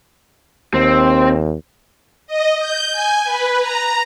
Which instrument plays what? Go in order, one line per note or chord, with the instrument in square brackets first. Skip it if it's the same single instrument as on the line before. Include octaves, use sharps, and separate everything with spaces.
[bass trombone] D#2 [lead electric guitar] C4
[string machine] D#5
G6
G#5
B4
A#5